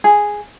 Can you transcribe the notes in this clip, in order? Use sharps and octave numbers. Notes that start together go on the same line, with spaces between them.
G#4